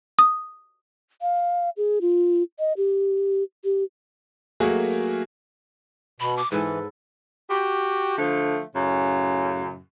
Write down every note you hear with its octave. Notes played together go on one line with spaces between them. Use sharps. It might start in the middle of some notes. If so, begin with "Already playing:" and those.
D#6
F5
G#4
F4
D#5
G4
G4
F#3 A3 A#3 F#4 G#4 A#4
B2 B5
D6
G#2 E3 E4 A4 B4
F#4 G4
D3 F3 A3
F#2 A2 C#3